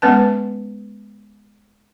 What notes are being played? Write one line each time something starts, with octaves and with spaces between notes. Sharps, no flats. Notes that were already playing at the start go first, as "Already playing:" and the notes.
G#3 B3 C#4 B4 A5